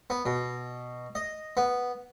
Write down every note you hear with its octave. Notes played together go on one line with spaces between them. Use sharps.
B3
B2
D#5
B3